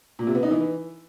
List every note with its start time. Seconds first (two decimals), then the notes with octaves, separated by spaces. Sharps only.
0.19 A#2
0.27 C3
0.35 B3
0.43 D#4
0.51 E3